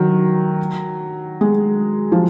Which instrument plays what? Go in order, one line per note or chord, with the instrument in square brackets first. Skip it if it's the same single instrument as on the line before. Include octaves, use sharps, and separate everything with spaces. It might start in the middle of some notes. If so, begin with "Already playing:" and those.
Already playing: [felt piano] D#3 F#3
G#3
F3